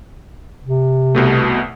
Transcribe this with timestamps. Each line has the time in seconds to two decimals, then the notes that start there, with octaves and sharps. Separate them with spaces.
0.65 C3
1.15 C2 B2 A3